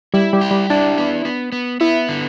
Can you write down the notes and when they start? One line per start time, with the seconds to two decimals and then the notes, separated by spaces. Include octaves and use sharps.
0.14 G3 E4
0.33 G3
0.41 G4
0.51 G3
0.70 D4 E4
0.98 B3
1.25 B3
1.52 B3
1.80 B3 E4
2.09 D3